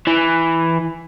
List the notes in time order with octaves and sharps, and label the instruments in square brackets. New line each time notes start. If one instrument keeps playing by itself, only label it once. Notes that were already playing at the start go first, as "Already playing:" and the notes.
[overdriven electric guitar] E3